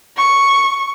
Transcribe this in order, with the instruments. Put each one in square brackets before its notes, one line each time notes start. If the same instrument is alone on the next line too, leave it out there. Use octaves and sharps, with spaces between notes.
[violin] C#6